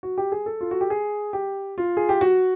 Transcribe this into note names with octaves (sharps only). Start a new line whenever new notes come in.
F#4
G4
G#4
A4
F4
F#4
G4
G#4
G4
F4
G#4
G4
F#4